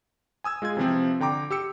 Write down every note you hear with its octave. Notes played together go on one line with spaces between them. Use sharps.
G#5 D#6 E6 G#6
G#3 F4 G#4 G#6
C3 E3 F3 C4
D3 G5 A#5 D6
G4 E6 C#7